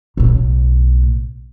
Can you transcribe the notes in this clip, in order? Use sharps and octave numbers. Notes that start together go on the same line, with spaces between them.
B1 A2